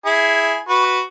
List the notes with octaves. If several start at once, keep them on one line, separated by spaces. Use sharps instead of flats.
E4 G#4
F#4 B4